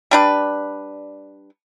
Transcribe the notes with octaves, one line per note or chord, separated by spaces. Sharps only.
G3 D4 B4